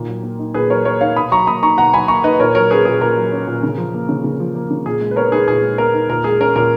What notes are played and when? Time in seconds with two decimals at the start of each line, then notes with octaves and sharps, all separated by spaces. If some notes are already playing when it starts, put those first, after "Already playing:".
Already playing: A#2 D#3
0.08 F#3
0.23 A#3
0.39 D#4
0.54 A#2 G#4 B4
0.70 F#3 A#4 C#5
0.85 A#3 A#4 C#5
1.01 D#4 C#5 F5
1.16 B2 B5 D#6
1.31 F#3 A#5 C#6
1.47 A#3 B5 D#6
1.63 D#4 A#5 C#6
1.78 B2 F#5 A#5
1.93 F#3 G#5 B5
2.08 A#3 A#5 C#6
2.24 D#4 B4 D#5
2.40 A#2 A#4 C#5
2.55 F#3 A#4 C#5
2.70 C#4 G#4 B4
2.85 A#2 G#4
3.01 A#2 A#4
3.17 F#3
3.32 C#4
3.47 A#2
3.63 C#3
3.78 F3
3.94 A#3
4.09 C#3
4.24 C#3
4.40 F3
4.55 A#3
4.71 C#3
4.86 A#2 G#4
5.01 G#3
5.11 B4
5.16 B3 A#4 C#5
5.32 D#4 G#4 B4
5.48 A#2 G#4
5.63 G#3
5.78 B3 A#4
5.94 D#4
6.09 A#2 A#4
6.24 G#3 G#4
6.40 C#4 A#4
6.56 A#2 A#4